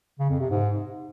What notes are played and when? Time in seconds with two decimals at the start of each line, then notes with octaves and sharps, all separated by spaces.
0.20 C#3
0.30 F2
0.40 C3
0.51 G#2